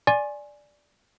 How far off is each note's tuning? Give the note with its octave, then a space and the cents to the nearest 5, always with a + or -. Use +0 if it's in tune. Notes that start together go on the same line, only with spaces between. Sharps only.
D5 +0 G#5 +5 C6 +40